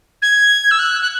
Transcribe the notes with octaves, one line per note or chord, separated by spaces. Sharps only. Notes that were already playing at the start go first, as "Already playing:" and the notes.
G#6
E6
F#6
F#6